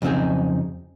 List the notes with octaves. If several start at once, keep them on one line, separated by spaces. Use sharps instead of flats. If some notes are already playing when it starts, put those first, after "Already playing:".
F2 C#3 F#3 C4 D#4 G#4